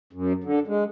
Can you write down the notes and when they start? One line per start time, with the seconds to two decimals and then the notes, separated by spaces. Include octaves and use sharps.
0.13 F#2
0.44 D3
0.67 G#3